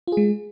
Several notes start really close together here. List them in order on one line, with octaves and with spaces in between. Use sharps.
F4 G#4 G#3